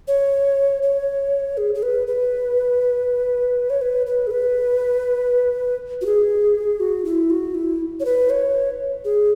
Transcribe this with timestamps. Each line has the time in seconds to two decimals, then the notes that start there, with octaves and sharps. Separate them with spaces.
0.08 C#5
0.82 C#5
1.57 G#4
1.75 G#4
1.83 B4
2.07 B4
3.70 C#5
3.81 B4
4.06 B4
4.27 G#4
4.31 B4
6.01 F#4
6.06 G#4
6.80 F#4
7.05 E4
7.30 F#4
7.55 E4
8.00 C#5
8.05 B4
8.30 C#5
9.05 G#4